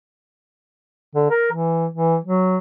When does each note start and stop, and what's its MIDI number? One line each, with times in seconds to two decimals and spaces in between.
1.15 1.26 50
1.30 1.51 70
1.52 1.86 52
1.93 2.17 52
2.24 2.58 54